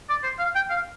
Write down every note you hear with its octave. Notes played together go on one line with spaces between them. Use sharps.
D5
C5
F5
G5
F5